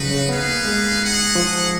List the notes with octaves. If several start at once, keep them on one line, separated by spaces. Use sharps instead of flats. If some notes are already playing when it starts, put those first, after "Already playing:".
Already playing: C#3 F3 F#3 D#4 F#4 B4
C#3
B3 D#4 G#4 B4 F5
A#3
G#3
D#4 G#4 D#5 F#5
F3